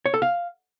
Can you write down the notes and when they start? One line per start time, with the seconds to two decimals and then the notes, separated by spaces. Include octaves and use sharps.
0.06 C#5
0.14 A4
0.22 F5